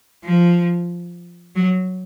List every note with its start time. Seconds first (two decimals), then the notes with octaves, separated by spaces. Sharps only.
0.24 F3
1.55 F#3